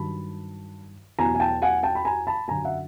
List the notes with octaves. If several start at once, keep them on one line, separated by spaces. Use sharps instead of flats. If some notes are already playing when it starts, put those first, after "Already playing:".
Already playing: G2 D#3 F#3 A5 B5
E2 B2 F#3 G#5 A#5
G#5
G5 A5
F#5 G#5
G5 A5
B5
G#5 A#5
A5 B5
F#2 D3 F#3 G#5 A#5
E5 F#5